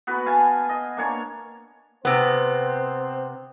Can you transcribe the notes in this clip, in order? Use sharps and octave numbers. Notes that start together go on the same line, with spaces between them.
B3 F#4 B4
F5 G#5 A5
D#5
A#3 D4 C#5
C3 B3 C4 C5